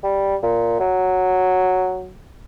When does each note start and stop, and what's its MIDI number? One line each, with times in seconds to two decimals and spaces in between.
0.03 0.36 55
0.43 0.75 46
0.80 2.12 54